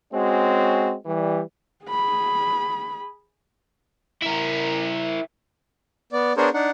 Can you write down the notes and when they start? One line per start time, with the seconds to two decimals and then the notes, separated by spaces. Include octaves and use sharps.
0.12 G#3 C4 C#4 F#4
1.06 E3 G3
1.86 G#4 B5
4.22 E4 A#4
6.12 B3 D5
6.37 B3 D4 G#4 A#4 C5 C#5
6.54 D4 D#4 F#5